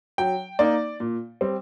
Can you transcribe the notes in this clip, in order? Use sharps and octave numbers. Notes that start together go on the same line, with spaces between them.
F#3 G5
A#3 D#4 D5
A#2
G3 C4